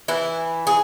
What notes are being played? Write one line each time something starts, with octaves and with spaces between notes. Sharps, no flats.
E3 E4
G#4